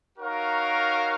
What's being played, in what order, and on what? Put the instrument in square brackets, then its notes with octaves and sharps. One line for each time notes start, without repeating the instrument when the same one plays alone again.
[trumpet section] D#4 F#4 A#4 C#5 F5